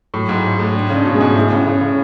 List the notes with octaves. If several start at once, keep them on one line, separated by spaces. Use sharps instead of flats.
A2 F#3
G#2
E4
G#4
A2
D4
C#3
D4
B2
G#3
G#2
A2 E4
C#3
E4
C#3
C#3 G#4